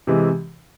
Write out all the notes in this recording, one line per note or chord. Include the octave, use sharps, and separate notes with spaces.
C3 E3 G#3